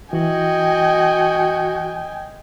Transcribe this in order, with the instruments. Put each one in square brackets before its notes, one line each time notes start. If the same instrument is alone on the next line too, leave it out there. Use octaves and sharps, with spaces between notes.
[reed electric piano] E3 [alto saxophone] F#4 [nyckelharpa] D#5 [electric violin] G5 G#5